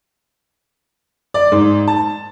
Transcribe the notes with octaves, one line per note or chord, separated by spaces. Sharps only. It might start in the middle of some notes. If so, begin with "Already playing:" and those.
D5
G#2
A5